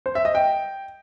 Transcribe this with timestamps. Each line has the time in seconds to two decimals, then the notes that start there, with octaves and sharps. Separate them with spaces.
0.06 C5
0.15 E5
0.25 D#5
0.35 G5